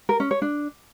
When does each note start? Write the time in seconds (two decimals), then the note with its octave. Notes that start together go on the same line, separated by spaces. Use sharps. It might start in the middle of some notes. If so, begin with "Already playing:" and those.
0.09 A#4
0.20 C#4
0.31 C#5
0.42 D4